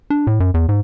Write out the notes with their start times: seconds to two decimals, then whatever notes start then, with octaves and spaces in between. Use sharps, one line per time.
0.10 D4
0.27 A2
0.40 F#2
0.54 E2
0.69 G#2